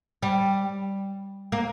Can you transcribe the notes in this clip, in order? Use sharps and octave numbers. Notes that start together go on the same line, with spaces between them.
G3
A#3